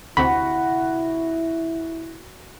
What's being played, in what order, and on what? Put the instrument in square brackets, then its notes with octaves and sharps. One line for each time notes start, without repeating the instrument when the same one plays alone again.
[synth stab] D2 C3 [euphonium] E4 [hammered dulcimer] F#4 [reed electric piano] B5